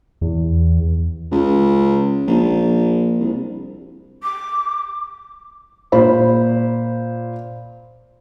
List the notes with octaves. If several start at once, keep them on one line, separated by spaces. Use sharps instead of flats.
E2
C#2
A#1
C2
D6
A#2 C5 B5